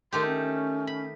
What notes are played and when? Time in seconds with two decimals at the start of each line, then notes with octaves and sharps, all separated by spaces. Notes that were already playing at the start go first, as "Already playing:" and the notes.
0.12 D#3 A3 G4 C6
0.26 C#4
0.87 B5